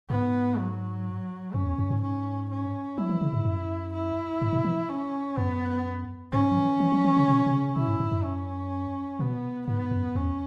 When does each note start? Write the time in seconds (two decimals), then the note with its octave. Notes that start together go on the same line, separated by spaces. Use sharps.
0.10 G#2 B3
0.58 F#3
1.54 F#2 C#4
1.65 E2
1.78 F#2
1.90 G#2
2.02 C#4
2.50 C#4
2.98 F#3 E4
3.09 E3
3.21 C#3
3.33 G#2
3.45 F#2
3.93 E4
4.42 G#2
4.53 B2
4.65 E3
4.89 C#4
5.37 F#2 B3
6.32 G#2 C#4
6.52 F#3
6.57 E3
6.80 E3
6.92 F#3
7.04 E3
7.17 C#3
7.29 B2
7.46 B2
7.53 C#3
7.76 B2 E4
7.88 G#2
8.00 G#2
8.12 F#2
8.24 C#4
9.19 B2 B3
9.67 G#2 B3
9.91 F#2
10.15 E2 C#4